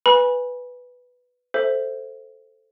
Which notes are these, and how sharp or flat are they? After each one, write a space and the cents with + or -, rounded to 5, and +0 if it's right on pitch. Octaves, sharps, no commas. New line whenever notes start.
B4 +0 G#5 -15 B5 -30
A4 +5 C5 +0 E5 +0